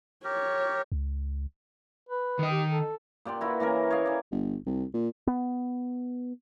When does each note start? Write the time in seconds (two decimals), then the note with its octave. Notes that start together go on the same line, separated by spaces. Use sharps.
0.24 G4 A#4 C#5
0.92 C#2
2.09 B4
2.39 D#3 D#5
2.51 G4
2.69 A4
3.25 A#2 G4 D5 C6
3.41 E4 F#4 B4
3.60 E3 A#3 C#4 A#4
3.90 C#5 D#5 F5
4.05 E3 D5
4.32 G1
4.66 C2
4.94 A#2
5.27 B3